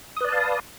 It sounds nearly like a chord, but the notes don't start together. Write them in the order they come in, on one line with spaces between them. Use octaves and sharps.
D#6 B4 D5 A5 F5